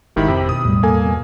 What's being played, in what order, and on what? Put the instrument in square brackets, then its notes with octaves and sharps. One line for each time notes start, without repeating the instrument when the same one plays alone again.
[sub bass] G1 [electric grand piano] G#2 D#3 E4 [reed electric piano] G4 [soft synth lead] B5
[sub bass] F2 [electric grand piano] C3
[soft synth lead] B2 [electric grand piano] D#6
[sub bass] E2 [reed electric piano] A2 G3
[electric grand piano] A#3 G#5 [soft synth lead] A4
[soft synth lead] B2